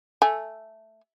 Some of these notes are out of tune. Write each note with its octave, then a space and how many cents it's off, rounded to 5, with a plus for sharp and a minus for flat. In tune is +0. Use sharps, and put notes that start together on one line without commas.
A3 +0 G#5 +0